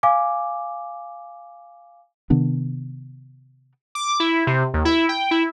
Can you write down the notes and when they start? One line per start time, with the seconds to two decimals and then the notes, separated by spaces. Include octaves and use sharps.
0.03 F5 G#5 D6
2.30 C3 D#3 B3 D4
3.95 D6
4.20 E4
4.47 C3
4.74 D#2
4.85 E4
5.09 G5
5.31 E4